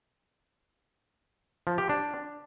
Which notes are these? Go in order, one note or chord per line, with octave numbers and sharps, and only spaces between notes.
F3
G4
D4